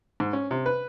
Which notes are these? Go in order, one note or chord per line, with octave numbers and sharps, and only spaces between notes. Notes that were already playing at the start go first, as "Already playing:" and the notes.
G#2
C#4
C3
B4